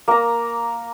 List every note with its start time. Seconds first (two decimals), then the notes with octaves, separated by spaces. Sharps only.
0.08 A#3 A#5